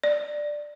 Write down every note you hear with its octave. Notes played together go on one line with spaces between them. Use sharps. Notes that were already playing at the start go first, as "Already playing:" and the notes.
D5